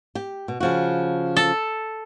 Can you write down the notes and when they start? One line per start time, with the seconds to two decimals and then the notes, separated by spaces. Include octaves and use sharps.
0.15 G4
0.48 B2
0.60 C#3 F3 F#4
1.36 A4